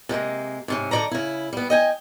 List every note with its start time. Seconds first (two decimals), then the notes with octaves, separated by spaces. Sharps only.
0.09 C3 G3 G#3 A#3
0.68 G#2 C3 C#4
0.91 G#2 D3 D#3 D5 A#5
1.11 C#3 E4
1.53 G3 B3
1.70 D#5 G5 G#5